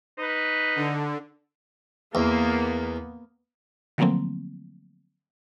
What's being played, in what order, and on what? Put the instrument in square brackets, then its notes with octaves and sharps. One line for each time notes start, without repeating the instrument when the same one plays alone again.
[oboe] D#4 [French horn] B4
[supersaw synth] D3
[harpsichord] E2 [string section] A#3 B3
[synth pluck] D3 F3 F#3 A3 A#3 C4